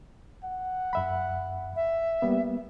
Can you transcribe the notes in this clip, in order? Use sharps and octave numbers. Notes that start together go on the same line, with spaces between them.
F#5
F#2 E5 B5
E5
G3 A#3 B3